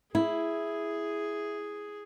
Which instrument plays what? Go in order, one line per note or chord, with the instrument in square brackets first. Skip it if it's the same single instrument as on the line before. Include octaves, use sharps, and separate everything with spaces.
[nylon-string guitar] E4 [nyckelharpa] G#4